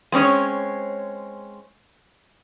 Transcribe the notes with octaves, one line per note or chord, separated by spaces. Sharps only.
G#3 C4 C#4 C#5